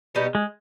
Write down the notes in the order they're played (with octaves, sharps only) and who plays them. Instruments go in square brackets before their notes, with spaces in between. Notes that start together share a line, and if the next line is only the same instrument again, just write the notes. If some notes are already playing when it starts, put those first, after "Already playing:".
[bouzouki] B2 G3 B3 D#4
[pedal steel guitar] G#3